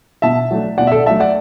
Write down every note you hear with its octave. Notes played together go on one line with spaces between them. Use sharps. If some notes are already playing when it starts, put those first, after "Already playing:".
B2 E5 A5
F#3 A3 D4
B2 D5 F#5
E5
A4 D5
F#3 A3 D4 E5 A5
D5 F#5